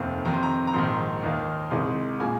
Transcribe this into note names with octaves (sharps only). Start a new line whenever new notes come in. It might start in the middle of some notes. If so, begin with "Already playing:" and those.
Already playing: F1 D#2 D#3 C4
F2 C3 D#3 A#5
C6
A#5
A#5
A#1 G#2 D#3 C6
D#2 D#3 A#3 D#4
C2 C3 G#3 D#4 C6
A#2 G#3 G#5